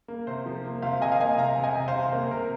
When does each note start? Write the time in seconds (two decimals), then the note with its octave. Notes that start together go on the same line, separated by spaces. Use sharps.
0.08 A#3
0.27 C3 C5
0.46 F3
0.65 A#3
0.82 C3 C5 F5
1.01 C3 D#5 G#5
1.12 F5
1.20 A#3 D#5 G#5
1.38 C3 F5 A#5
1.58 C3
1.63 D#5 G#5
1.75 C3
1.88 C5 F5
1.95 C3
2.12 A#3 C5
2.31 C3 A#4